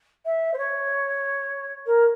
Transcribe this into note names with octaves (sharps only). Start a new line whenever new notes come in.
E5
C5
C#5
A#4